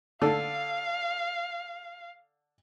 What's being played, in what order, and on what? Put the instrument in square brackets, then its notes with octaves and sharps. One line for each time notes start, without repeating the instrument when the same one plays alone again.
[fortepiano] D3 A4 [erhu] F5